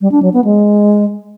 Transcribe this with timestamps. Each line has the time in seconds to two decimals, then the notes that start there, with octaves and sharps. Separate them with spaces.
0.01 G3
0.12 D4
0.23 F#3
0.33 B3
0.44 G#3